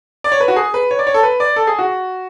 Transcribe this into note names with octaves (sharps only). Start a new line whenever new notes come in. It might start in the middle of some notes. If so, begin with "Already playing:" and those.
D5
C#5
B4
F#4
G#4
B4
C#5
D5
C#5
A4
B4
D5
A4
G#4
F#4